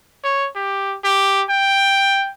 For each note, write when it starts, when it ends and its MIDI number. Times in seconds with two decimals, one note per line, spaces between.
0.24 0.49 73
0.56 0.96 67
1.04 1.44 67
1.49 2.31 79